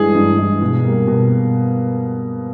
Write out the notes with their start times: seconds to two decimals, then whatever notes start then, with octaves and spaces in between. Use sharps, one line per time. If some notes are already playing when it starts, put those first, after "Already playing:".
Already playing: G2 E3 G#3 G#4
0.15 G2
0.38 E3 G#3
0.62 B2
0.84 G3 A#3
1.07 B2